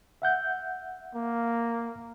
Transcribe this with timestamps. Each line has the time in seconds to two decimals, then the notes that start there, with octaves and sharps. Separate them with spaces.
0.22 E5 F#5 G6
1.15 A#3